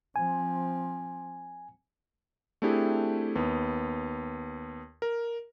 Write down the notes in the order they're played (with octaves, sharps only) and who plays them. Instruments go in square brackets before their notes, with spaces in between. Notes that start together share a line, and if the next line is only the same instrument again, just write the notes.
[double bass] F3 C4 [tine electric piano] G#5
[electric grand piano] A3 C4 D4 E4 G4 G#4
D#2 B3
A#4